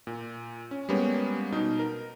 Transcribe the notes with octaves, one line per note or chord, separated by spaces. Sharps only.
A#2
C#4
G3 G#3 A#3 B3 C#4 G4
B2 D#4
A#4